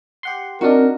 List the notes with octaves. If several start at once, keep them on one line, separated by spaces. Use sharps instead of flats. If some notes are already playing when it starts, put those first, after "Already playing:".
G4 F#5 C6
D#3 C4 D4 F#4 A#4 D#5